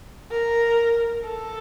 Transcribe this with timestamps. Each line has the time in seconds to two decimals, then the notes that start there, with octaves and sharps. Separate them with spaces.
0.31 A#4
1.24 A4